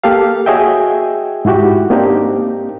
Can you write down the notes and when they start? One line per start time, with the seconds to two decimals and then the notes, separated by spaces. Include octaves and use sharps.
0.04 A#3 G4 A4 F5
0.46 F#4 G#4 C#5 D#5 E5 G5
1.45 G#2 E4 F#4 G4
1.90 A#3 C4 D4 D#4 G4 A#4